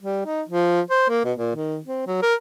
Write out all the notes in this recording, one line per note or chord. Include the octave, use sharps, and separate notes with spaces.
G3
D#4
F3
C5
A#3
B2
A#2
D#3
C4
F#3
A#4